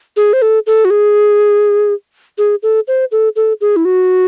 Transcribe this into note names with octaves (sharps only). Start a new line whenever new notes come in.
G#4
C5
A4
A4
F#4
G#4
G#4
A4
C5
A4
A4
G#4
E4
F#4